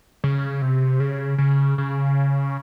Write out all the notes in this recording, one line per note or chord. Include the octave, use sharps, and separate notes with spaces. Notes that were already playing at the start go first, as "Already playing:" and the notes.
C#3
C3
C#3
C#3
C#3